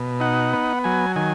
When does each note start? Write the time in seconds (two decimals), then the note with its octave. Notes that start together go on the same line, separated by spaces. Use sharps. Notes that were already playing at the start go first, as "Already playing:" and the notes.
Already playing: B2
0.20 D#4 F#5
0.53 B3
0.84 F#3 G#5
1.16 D#3 G#5